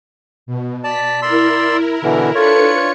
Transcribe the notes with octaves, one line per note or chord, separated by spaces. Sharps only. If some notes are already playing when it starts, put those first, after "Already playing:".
B2
D5 A5 B6
E4 A#4 D5 C6 E6
B2 D3 E3
D4 F4 A4 B4 C#5 C#7